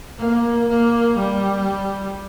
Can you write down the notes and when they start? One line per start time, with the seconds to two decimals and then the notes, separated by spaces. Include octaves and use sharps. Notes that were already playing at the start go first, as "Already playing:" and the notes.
0.20 A#3
0.69 A#3
1.19 G3